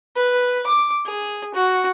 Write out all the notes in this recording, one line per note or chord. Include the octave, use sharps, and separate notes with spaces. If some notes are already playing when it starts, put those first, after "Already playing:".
B4
D6
G#4
F#4